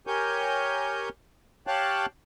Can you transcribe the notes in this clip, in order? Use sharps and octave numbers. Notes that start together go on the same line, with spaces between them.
G4 A#4 C#5 G#5 G6
G4 C#5 F5 G5 A5 F#6